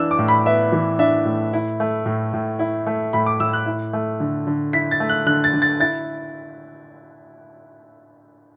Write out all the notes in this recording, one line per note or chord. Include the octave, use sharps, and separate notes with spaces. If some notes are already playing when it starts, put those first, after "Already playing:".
Already playing: E3 D4 E6
D6
A2
B5
B3 E5
E3
D4 E5
A2
E4
A3
A2
A2
E4
A3
A2 B5
D6
A2 E6
F#6
E4
A3
D3
D3
E4 B6
A6
A3
F#6
D3 F#6
A6
D3
A6
E4 A6